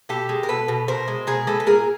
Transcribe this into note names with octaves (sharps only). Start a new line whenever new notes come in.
B2 G4 A4
G#3
A#4
B2 A4 B4
B2
B2 A#4 C5
G#3
B2 G#4 A#4
G#3 A4 B4
B4
A#2 G#4 A#4